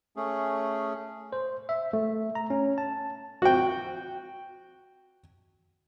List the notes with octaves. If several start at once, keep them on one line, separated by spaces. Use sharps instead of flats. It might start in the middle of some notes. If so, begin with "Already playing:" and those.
A3 C#4 G#4
C5
E5
A3
A#5
C#4
A5
F#4 G5